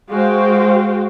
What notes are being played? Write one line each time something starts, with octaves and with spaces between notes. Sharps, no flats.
G#3 F#4 G#4 C5 F5 G5